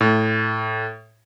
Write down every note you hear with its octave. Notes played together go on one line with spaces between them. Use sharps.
A2